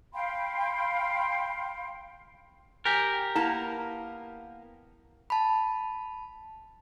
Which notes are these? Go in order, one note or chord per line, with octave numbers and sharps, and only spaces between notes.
F5 G5 B5 C6
G4 A#4 G#5
A#3 B3 E4 A5
A5 B5